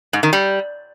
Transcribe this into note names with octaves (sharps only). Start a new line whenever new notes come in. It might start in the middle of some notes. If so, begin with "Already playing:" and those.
G#2
D#3
G3